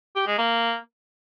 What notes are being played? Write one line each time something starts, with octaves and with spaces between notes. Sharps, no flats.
G4
G#3
A#3